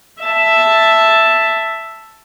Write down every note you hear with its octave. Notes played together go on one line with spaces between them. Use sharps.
E5 A5